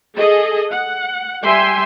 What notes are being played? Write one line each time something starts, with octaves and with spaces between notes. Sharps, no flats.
G#4 A4 D#5
F#5
G3 G4 E5 G5 G#5 C6